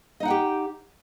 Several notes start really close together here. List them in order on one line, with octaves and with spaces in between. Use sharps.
D#5 D#4 F#5 G5 G4